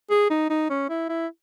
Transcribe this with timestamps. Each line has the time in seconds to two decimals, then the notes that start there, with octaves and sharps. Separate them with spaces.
0.10 G#4
0.30 D#4
0.50 D#4
0.70 C#4
0.89 E4
1.09 E4